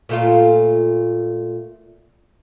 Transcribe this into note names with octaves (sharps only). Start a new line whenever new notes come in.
A#2 A3 F4